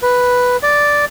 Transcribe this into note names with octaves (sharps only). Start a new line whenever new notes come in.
B4
D5